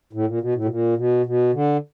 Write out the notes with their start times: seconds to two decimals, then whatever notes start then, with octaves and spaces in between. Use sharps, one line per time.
0.13 A2
0.26 A#2
0.41 B2
0.54 A2
0.64 B2
0.69 A#2
0.97 B2
1.26 B2
1.54 D3